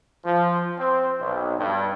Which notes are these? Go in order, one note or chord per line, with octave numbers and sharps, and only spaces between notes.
F3
C4
B1
G2